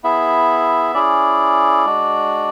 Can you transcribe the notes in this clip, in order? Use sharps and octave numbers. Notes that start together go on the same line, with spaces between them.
B3 E4 G#4 E5
C#4 E4 G#4 D5
G#3 D4 F#4